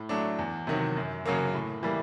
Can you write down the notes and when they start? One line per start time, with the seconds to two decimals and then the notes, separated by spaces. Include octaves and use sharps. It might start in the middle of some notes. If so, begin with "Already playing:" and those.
Already playing: A2
0.09 F#3 A3 D4
0.39 E2
0.67 C3 D#3 F#3
0.97 F#2
1.26 C#3 F#3 A#3
1.54 A2
1.83 E3 G3 A#3